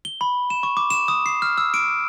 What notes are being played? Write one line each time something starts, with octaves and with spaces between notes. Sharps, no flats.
G7
B5
E7
C#6
D6
E7
D#6
C7
F6
E6
D7